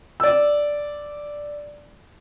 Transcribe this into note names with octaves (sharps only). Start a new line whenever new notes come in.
D5 E6